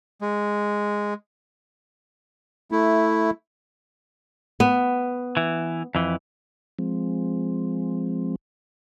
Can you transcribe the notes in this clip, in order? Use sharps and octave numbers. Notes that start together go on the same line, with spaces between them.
G#3
A3 E4
B3
E3
F2 E3
F3 G#3 C4